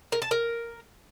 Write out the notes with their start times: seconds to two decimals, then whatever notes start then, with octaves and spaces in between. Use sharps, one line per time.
0.12 A#4
0.22 A5
0.31 A#4